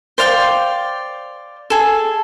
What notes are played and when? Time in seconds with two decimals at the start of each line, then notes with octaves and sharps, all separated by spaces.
0.18 C5 D5 F5 G5
1.70 G#4 A4